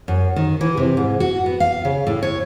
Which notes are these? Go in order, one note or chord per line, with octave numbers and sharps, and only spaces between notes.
F#2
D#3
E3
C3
G#2
F#4
B3
F5
C#3
A2
C#5